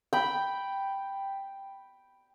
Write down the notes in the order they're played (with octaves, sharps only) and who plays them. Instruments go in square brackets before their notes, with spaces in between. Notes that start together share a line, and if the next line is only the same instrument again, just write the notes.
[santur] G5 B5